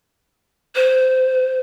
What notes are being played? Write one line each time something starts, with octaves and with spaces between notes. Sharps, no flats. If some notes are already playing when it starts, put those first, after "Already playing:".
C5